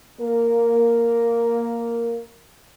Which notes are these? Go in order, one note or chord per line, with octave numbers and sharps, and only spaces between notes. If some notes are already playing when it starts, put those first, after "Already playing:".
A#3 A#4